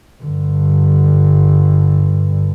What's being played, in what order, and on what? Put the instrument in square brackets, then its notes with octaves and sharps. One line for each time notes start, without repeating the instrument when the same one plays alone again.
[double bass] G2 D3